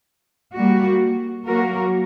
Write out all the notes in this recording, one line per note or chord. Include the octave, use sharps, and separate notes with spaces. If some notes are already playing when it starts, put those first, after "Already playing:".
G3 A#3 F#4
F#3 A#3 F#4 A#4